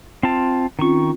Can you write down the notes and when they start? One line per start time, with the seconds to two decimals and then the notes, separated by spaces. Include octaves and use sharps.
0.23 C4 F4 A5
0.79 D#3 C4 C#4 F4 C#6